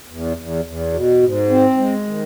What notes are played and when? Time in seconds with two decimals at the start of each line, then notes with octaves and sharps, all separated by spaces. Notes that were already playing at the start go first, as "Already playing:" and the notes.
0.08 E2
0.37 E2
0.65 E2
0.93 B2
1.22 G#2
1.50 C4
1.78 G#3
2.06 D#3